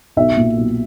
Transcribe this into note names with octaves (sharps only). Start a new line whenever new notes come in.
B1 E5
A#2
B1